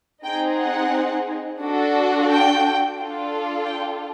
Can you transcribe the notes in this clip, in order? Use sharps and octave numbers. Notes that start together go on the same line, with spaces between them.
C4 D#4 G#4 G5
F#5
D4 F#4 A4
G5
D4 F4 A4
G5